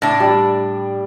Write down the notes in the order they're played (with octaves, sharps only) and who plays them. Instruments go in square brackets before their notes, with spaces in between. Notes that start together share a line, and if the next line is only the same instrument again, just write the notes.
[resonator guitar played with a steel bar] A2 D4
[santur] G3